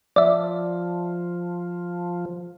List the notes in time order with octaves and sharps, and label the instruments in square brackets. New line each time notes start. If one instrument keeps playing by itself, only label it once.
[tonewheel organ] F3 [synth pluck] D5 E5